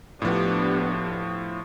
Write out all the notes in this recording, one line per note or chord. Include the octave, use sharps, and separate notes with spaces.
A2 F3 B3 D4 G4